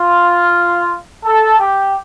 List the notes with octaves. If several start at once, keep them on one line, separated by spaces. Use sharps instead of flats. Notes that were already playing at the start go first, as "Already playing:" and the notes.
Already playing: F4
A4
G4